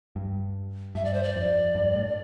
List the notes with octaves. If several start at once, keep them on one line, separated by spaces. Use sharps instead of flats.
G2
G2 E5
D5
C5
D5
F2
G2
A2